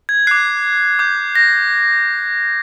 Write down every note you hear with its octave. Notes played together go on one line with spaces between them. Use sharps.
G#6
D6 F#6 C7
D6 G6
A#6